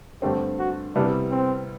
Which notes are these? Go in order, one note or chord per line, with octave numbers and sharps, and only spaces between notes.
G2 D3 A3 C4 G4
F#4
C3 G3 B3 D4 E4
C4